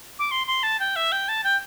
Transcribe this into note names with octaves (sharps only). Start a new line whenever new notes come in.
D6
C6
C6
A5
G5
E5
G5
A5
G5